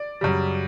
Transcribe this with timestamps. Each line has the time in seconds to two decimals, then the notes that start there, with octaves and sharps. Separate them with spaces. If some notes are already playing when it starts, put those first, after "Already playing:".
Already playing: D5
0.21 F#2 C#3 G3